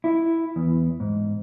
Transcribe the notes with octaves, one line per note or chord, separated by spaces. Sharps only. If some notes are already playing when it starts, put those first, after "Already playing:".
E4
E2
G#2